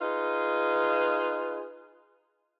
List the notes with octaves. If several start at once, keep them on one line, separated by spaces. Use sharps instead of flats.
D#4 F4 G#4 B4